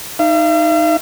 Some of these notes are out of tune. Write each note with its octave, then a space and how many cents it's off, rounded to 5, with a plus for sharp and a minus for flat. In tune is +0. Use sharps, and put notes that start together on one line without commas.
D#4 +0 F5 -45